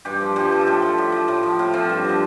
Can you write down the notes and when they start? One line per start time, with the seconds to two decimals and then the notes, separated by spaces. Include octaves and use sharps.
0.05 G2 G4
0.21 F3
0.36 G2 G4
0.52 F3
0.61 A4
0.67 A2 G4
0.82 F3
0.98 A2
1.12 F3
1.28 A2
1.43 F3
1.59 A2 F4
1.73 F3 C4
1.89 G2
2.05 D3 F3